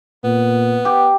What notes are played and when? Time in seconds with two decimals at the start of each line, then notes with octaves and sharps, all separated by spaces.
0.24 A#2 B3
0.85 G4